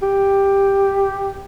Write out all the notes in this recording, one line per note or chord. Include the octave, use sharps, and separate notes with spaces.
G4